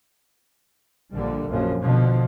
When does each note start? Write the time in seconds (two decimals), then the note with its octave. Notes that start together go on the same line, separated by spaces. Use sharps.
1.16 A#1 A#2 D3 G3
1.49 A#1 F#2 F3
1.82 B2 D3 F3